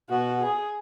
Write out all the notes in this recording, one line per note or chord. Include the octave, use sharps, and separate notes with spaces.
B2 B3 F#4
G#4